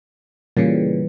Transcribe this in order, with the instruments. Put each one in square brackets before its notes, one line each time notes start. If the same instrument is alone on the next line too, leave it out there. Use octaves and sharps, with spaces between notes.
[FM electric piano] A#2 C#3 [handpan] E3 G3